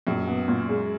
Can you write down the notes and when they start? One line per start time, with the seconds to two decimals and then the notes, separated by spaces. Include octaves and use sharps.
0.07 A#1 F#2
0.27 B3
0.48 A#2
0.69 G#3